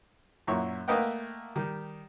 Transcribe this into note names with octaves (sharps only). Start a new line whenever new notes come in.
F#2 A#2 E4 C#5 C#6
A3 A#3 B4 D#5 F#5 G5
D#3 G3